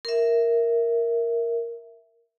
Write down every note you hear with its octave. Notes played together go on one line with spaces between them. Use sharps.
A#4 E5